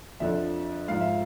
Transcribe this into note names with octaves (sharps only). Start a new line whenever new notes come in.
F2 D3 F3 E5
G#2 F3 F5
E5